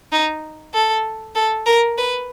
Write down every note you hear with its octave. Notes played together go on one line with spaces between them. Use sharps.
D#4
A4
A4
A#4
B4